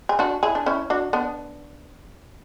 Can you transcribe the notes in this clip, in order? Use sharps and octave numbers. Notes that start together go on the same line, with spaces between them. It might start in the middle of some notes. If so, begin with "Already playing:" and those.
G#4
D4 F#4
E4 G#4
D4
C#4 E4
D4 F#4
B3 D4